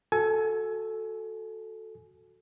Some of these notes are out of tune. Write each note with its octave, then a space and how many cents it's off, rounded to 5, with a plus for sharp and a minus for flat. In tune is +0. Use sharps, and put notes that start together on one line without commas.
F#4 -15 A4 +0 G#5 +25